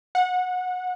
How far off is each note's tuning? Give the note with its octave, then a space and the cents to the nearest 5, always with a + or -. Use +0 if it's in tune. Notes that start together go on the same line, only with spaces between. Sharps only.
F#5 -20